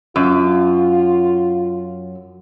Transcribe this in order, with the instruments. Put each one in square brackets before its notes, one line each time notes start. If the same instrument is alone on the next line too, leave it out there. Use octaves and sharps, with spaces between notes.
[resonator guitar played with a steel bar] F#2 [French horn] F4